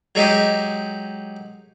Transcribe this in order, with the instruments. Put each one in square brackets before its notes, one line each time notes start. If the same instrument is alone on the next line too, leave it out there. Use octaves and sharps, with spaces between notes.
[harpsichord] F#3 G#3 D#4 G4